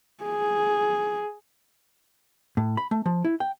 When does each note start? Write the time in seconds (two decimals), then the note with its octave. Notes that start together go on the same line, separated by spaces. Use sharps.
0.24 G#4
2.57 A2
2.77 B5
2.91 A3
3.06 F3
3.24 E4
3.40 G5